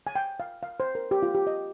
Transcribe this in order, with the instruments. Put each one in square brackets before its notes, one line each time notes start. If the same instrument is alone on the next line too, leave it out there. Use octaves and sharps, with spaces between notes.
[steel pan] G#5
G5
F5
F5
C5
A#4
G4
F4
G4
D#5